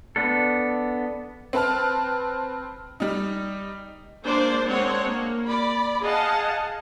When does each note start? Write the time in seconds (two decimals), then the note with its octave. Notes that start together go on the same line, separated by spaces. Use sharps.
0.16 B3 D4 A4
1.53 C4 B4 A5 F6
3.00 G3 D#4
4.24 G#3 A#3 D4 C5 D5
4.66 G#3 A#3 C4 D4 C#5 F#5
5.04 A#3
5.46 D5 B5
6.01 G#4 D#5 F5 F#5 A5